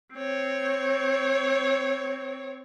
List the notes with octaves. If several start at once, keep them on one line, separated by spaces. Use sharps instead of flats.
C4 C#5